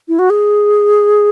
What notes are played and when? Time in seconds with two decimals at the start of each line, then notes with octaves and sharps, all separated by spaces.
0.08 E4
0.19 F#4
0.30 G#4